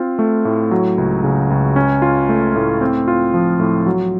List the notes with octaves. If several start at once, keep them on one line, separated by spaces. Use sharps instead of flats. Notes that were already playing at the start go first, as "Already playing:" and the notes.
Already playing: C4 F4
A3
A2
F#3
C#2
C#3
C#2
C#4
F4
A3
A2
C4
F4
F3
A2
F#3